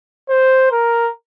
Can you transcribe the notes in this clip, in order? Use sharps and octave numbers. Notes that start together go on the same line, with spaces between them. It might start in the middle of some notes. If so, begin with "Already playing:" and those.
C5
A#4